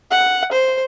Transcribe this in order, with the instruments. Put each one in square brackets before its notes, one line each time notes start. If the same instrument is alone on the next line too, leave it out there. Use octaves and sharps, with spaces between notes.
[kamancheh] F#5
C5